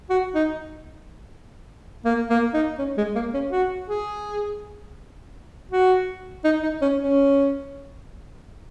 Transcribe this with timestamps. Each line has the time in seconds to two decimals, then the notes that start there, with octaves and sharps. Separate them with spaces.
0.10 F#4
0.35 D#4
2.05 A#3
2.30 A#3
2.54 D#4
2.79 C#4
2.97 G#3
3.15 A#3
3.34 C#4
3.52 F#4
3.88 G#4
5.72 F#4
6.44 D#4
6.63 D#4
6.82 C#4
7.00 C#4